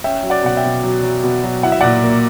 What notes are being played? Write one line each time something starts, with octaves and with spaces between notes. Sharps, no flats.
C#4 E5 G5
F#3
D5 F#5
B2 F#5
E5 G5
B2
F#3
F#3
B2
F#3
E4 F#5
E5
A#2 D5 F#5
A#3